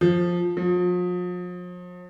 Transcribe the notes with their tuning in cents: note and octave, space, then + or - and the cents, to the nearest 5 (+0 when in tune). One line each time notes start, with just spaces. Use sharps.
F3 +10
F3 +40